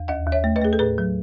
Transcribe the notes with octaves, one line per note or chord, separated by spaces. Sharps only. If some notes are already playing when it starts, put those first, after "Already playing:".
Already playing: E2
D#2 D#5 F#5
D#2
C#5 E5
A3
B4 D#5
A3 G#4
A4
A2 G#4 B4
F#3